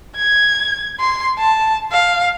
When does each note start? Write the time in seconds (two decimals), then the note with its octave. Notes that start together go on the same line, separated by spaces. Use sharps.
0.17 G#6
1.00 C6
1.38 A5
1.92 F5